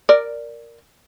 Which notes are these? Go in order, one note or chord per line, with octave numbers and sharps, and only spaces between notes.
A#4 D5